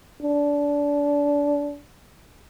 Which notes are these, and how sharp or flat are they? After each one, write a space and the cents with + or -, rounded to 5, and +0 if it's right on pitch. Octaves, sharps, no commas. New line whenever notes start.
D4 -25